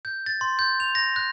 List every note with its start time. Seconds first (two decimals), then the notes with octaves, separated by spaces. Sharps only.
0.05 G6
0.26 A6
0.41 C6
0.59 G6
0.80 F7
0.95 A#6
1.16 F#6